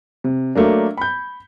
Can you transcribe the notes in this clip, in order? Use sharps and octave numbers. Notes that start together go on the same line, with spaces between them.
C3
F#3 A3 A#3 D4
B5 G6